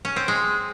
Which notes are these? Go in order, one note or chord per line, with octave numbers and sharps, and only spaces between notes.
C#4
C4
G#3